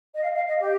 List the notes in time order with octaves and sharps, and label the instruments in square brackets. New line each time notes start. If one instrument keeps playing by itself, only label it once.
[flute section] D#5
F5
F5
D#5
G4